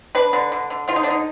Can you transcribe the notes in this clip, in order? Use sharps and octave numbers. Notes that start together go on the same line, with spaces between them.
D4 B4
D3
D3
D3
D3 F4
D#4
D4
D3 D#4